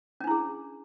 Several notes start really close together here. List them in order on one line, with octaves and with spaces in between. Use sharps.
C#4 D4 E4 G#4